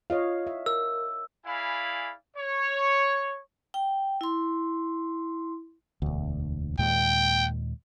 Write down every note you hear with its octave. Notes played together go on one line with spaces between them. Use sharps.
F4 C#5 D#5 F5
E5
A#4 E6
E4 G#4 D5 F5 G#5 B5
C#5
G5
E4 C6
E1 D2
D#2 A#2 G#3 G5